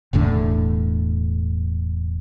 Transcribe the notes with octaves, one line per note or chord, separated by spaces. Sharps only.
E1 E2 A2 D3